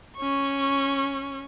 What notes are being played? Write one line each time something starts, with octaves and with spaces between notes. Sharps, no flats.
C#4 C#6